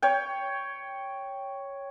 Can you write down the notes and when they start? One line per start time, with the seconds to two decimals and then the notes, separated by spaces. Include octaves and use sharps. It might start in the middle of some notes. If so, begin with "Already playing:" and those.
0.02 C#5 G5